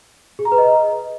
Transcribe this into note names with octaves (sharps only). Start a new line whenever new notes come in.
G#4
A#5
B4
D#5